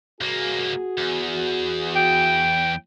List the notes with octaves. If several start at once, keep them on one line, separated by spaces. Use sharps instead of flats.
C2 A#3 F#4 G#4
E2
G5